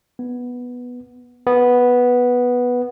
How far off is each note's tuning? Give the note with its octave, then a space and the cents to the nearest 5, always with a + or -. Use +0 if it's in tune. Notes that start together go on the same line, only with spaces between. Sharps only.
B3 -5
B3 -5